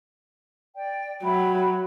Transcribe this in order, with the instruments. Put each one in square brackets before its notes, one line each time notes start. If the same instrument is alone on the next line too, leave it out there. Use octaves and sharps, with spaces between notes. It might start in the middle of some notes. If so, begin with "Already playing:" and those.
[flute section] D5 G5
[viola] F#3 [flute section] E5 G5 B5